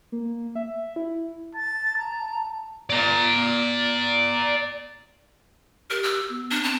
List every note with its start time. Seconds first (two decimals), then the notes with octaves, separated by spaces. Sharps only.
0.12 A#3
0.55 E5
0.96 E4
1.55 A5 A6
1.98 A#5
2.90 D5 A#5
5.90 G4 A#4
6.03 E6
6.29 B3
6.51 D4
6.63 C4 A5